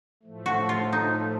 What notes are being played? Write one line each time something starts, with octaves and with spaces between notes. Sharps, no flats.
A2 F3 A3
F#4
F4
D#4